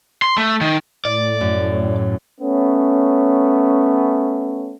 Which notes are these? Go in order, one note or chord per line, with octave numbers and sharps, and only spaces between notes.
C6
A3
D#3
A2 D5
F#2
A3 B3 C#4